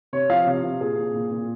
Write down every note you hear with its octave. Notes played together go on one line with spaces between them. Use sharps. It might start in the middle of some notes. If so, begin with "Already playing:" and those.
C3 C#5
F3 F5
C3
C3
A#2 G#4
A#2
A#2
A#2